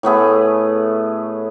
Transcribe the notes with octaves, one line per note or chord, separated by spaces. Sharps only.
A2 A3 B3 G#4